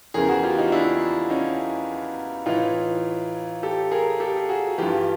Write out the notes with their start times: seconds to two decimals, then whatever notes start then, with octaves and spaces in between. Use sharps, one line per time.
0.14 E2 C#3 E3 G#4 A#4
0.28 F#4 G#4
0.43 F4 G4
0.59 D#4 F4
0.72 D4 E4
1.30 C#4 D#4
2.46 A2 E3 D#4 F4
3.63 G4 A4
3.91 G#4 A#4
4.20 G4 A4
4.49 F#4 G#4
4.78 G2 E3 F4 G4